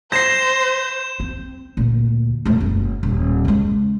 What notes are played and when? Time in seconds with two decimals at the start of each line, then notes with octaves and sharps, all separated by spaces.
0.12 C5 G6 A#6 C7 E7
1.20 C4
1.77 D2 A#2
2.45 E1 A3
2.61 F#1
3.03 D#1
3.45 C#3 G#3